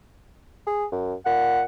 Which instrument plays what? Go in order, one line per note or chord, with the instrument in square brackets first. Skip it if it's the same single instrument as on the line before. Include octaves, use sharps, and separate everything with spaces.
[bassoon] G#4
F#2
[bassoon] A#2 [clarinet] F#5